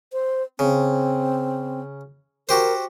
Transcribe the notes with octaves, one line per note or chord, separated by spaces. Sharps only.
C5
C#3 C4
F#4 G4 A#4 C5